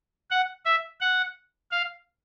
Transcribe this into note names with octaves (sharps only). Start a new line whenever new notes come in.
F#5
E5
F#5
F5